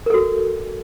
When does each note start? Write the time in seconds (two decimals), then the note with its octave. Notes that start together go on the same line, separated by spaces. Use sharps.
0.06 A#4
0.10 A4
0.14 F#4